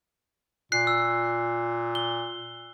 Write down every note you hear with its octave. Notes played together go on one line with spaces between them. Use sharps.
A#2 F#6 C7
E6
G7